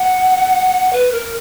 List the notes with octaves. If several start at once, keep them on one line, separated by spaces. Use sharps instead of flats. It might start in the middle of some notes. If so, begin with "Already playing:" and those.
Already playing: F#5
B4
A#4